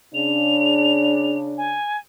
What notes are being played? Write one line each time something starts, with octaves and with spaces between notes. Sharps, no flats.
C#3 D4 F7
G#5